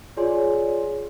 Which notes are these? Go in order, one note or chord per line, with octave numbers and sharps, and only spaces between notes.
F4 G#4 C#5 D5 G#5 C6